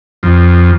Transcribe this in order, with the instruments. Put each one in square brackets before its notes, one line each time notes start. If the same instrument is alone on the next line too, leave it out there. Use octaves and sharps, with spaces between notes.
[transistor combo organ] F2